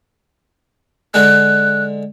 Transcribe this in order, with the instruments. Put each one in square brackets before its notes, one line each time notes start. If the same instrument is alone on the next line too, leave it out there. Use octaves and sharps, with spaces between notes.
[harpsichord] D3 G#3 [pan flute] F#6